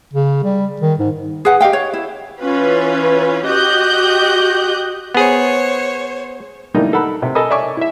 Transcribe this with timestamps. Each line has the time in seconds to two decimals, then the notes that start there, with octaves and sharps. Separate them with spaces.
0.14 C#3
0.44 G3
0.81 D#3
1.00 G#2
1.45 G#4 B4 F#5
1.61 G4 D#5 F5 G5
1.73 C#5
1.94 E4
2.41 E3 C#4 F4 B4
3.45 F#4 G4 D#5 F#6 G6
5.14 B3 G#4 C5 C#5
6.74 D3 E3 G3 A3 A#3 D#4
6.93 A4 A#4 F#5 B5
7.22 C3
7.35 A4 A#4 D#5 G#5 B5 D#6
7.50 C#5 D5 E5 G#5 C#6 D6
7.77 E4 E5